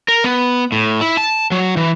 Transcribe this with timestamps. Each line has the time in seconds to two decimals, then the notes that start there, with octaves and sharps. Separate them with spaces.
0.08 A#4
0.24 B3
0.72 A2
1.01 E4
1.17 A5
1.52 F#3
1.77 E3